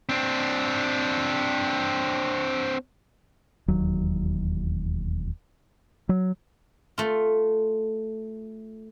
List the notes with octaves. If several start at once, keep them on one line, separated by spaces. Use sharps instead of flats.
C4 D4
E1 D#2 F#3
F#3
A3 F4